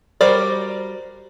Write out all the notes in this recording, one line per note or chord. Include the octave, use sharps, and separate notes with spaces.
G3 F#4 A#4 C5 D5